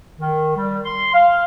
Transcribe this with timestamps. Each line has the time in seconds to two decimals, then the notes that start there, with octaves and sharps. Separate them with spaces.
0.19 D#3
0.56 G3
0.84 C6
1.14 F5